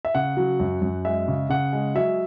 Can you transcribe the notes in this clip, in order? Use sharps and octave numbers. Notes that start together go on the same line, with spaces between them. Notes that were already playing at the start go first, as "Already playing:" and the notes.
E5
C#3 F#5
F#3
F#2
F#2
G#3 E5
C#3
C#3 F#5
G#3
F#3 E5